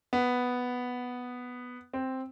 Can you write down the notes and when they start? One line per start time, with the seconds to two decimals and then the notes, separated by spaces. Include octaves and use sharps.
0.13 B3
1.93 C4